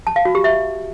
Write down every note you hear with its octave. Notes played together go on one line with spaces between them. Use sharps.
A5
F5
F#4
G4
E5